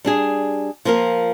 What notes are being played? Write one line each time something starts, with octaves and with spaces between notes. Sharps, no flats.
G3 D4 G#4
F3 A#3 F4 A#4